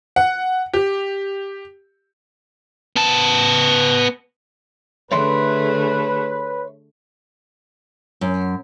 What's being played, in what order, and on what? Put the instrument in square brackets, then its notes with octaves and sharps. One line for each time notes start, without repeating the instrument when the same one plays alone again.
[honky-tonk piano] F#5
G4
[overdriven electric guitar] B3 A5
[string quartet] D3 A3 G#4 [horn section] B4 [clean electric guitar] C#5 E5 C6
[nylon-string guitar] F#2